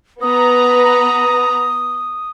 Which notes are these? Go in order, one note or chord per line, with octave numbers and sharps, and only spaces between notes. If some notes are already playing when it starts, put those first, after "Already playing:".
B3 B4 A#5 D#6